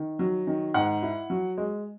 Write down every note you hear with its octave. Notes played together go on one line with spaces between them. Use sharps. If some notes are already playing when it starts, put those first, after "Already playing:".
Already playing: D#3
F#3
D#3
G#2 F#5
E4
F#3
G#3